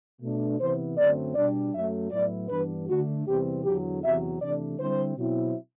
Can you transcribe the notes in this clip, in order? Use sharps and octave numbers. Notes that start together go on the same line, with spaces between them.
B2 A3 D4
C3 E3 B3 E4 C5
F#2 D3 F#3 A3 C4 D5
B2 G3 D4 D5
F#2 F#3 A3 E5
A2 F#3 B3 E4 D5
G2 E3 B3 D4 B4
D3 A3 D4 F#4
E2 C3 E3 G3 C4 G4
E2 D3 F#3 G4
E2 C3 F#3 E5
C3 E3 A3 D4 D5
D3 G3 C4 E4 C5
B2 F#3 C4 E4